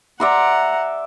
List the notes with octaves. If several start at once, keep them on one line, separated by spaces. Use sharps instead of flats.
D5 E5 F#5 A#5 C6